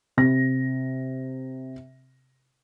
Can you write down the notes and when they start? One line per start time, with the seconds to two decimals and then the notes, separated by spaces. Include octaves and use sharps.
0.17 C3 A#6